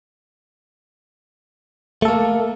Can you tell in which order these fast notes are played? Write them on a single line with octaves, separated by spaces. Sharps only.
A3 A4 A#3